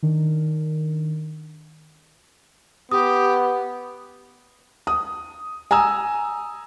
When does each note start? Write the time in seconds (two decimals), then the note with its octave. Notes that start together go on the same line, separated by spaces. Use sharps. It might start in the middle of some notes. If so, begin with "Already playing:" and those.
0.03 D#3 D4 A#4
2.92 B3 G4 D#6
4.87 D#6
5.71 G#5 A#5 D#6 E6